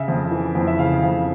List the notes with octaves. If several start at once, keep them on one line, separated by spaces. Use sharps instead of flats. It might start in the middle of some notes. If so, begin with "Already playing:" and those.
Already playing: C#3 E5
F2
E3
F2
E5
C#3 F5
F2